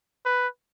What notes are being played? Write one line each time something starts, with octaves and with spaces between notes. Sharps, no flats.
B4